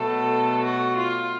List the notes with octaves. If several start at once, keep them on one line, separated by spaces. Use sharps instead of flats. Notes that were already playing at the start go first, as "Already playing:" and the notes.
Already playing: B2 F#3 A3 A4
F#4
F4